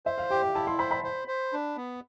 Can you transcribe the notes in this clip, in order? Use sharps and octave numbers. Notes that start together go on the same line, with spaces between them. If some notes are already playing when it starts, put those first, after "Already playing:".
C5 E5
F5
G4 G5
G5
E4 A5
C6
C5 B5
B5
C5
C5
D4
B3